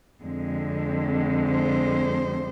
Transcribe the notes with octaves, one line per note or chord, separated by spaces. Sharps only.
F2 D3 G#3 C4
C5